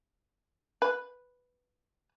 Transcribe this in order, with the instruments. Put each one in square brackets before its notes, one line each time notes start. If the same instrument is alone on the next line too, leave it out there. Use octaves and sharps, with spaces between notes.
[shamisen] B4